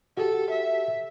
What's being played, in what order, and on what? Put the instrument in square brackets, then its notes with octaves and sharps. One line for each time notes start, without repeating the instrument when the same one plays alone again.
[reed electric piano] F#4 G4 [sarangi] A4
[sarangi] E5